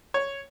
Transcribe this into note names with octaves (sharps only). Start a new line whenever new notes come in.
C#5